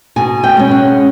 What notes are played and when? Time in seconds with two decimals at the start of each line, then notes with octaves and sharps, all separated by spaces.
0.16 B2 G#5
0.44 G5
0.57 G#3 C#4
0.71 F#5